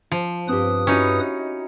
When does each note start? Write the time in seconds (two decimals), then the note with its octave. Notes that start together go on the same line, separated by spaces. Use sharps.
0.12 F3
0.48 G2 C4 G4 B4 D#6
0.87 C#4 D#4 E4 F#4